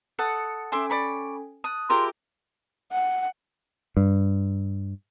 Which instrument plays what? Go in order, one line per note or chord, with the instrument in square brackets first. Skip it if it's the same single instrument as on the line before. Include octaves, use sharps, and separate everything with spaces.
[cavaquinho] A4 F#5 D#6 [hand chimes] C#7
[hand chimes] C#4 A4 G#5 [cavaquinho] E5 C6 D6
[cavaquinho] D5 B5 C#6
[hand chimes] A5 F#6 [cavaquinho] D#6
[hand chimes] F4 G#4 A5 [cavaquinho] G4 A#4 E5 [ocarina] C6
[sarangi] F#5
[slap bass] G2